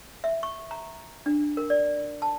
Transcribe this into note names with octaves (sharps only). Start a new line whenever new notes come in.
E5
C#6
A#5
D4
A#4
D5
A5